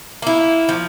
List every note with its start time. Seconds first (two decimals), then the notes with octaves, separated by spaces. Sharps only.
0.22 A#3 E4
0.69 F3